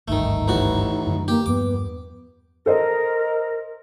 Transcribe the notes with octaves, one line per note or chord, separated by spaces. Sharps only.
G#1 D2 G2 D#3 A3 D#4
A1 A2 F#4
F#2 D3 D#3
A#3 G4
E2 G2 F3 B3 D6
A4 A#4 C5 D#5